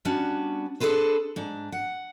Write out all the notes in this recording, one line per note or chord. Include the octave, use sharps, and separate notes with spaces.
G3 B3 C#4 D4 F#4
D4 G#4 A4 B4 C5
G#2 D4
F#5